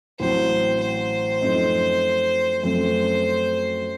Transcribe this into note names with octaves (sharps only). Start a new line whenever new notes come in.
A1 A2 F#3 C4 C5
C5
F#2 F3 A3 C4 D#4
F#2 F3 A3 C4 C5